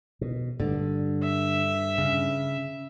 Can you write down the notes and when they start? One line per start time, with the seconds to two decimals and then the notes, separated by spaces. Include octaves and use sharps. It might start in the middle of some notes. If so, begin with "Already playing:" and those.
0.21 B2
0.60 G2 D3
1.23 E5
1.98 C#3